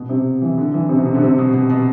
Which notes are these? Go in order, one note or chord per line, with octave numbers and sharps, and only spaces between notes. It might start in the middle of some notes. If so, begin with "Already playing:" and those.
Already playing: B2
C3
E3
D3
E3
C3
B2
C3
D3
C3
B2
B2
B2